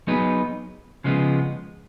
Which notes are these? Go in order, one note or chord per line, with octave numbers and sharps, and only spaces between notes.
F#3 B3 D#4 G#4 B4
C#3 F3 G#3 B3